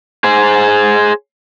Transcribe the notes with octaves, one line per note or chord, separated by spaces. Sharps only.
G#4 C5